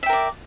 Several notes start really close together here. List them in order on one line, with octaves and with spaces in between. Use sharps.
E5 G5 A#4 D5